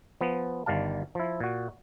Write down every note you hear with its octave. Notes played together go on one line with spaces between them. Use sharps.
F3 B3
G1 D#3 G3 F5 A5
F3 E4
A#2 F#4